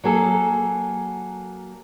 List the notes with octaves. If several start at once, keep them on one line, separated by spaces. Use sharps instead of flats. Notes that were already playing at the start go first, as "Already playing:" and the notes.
F#3 A#3 G#4 A4